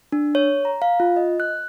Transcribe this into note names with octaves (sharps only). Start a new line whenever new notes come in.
D4
C#5
A#5
F5
F4
D#5
F#6